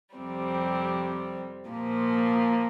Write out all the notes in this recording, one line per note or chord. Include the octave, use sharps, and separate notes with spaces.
F2 C3 G3 C4
A#2 F3 A#3